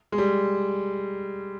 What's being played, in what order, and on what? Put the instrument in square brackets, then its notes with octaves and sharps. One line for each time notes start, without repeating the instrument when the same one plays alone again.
[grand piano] G#3
G3